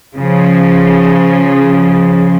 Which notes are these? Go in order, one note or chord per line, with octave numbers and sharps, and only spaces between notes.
C#3 F3